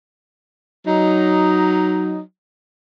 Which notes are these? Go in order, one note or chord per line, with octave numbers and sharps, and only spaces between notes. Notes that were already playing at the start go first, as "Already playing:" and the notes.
F#3 D#4